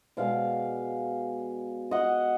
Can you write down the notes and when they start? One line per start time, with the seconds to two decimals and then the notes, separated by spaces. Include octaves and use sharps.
0.17 B2 G#3 D5 F5
1.91 D#5 F#5